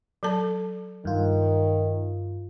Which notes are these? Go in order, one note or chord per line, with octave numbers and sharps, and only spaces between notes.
F#3 A4 A5
G2 D#3 F4